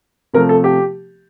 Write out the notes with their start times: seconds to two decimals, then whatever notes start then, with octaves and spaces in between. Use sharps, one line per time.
0.33 C3 F3 A3 A#4
0.49 A4
0.64 G4